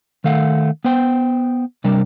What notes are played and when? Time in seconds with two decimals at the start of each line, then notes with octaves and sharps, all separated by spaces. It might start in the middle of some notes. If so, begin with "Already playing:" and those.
0.24 D#3 A3 F5 F#5
0.84 B3 C5 G5
1.84 C3 G3 D4 A#4